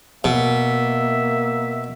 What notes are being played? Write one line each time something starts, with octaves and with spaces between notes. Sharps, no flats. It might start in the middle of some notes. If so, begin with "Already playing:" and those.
B2 A#3 E5